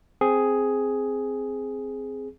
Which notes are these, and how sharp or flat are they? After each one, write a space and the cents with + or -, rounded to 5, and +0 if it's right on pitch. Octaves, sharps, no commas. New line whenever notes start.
C4 +0 G#4 +5